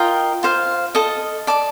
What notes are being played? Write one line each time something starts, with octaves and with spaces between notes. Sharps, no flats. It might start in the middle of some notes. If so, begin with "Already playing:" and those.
Already playing: F4 A#4 D#5 G5
F4 C5 F5
A4 D#5 A5
D5 A5 D6